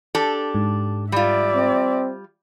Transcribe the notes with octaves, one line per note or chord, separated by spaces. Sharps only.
D4 G4 A4
G#2
G3 F4 D5 E5
C4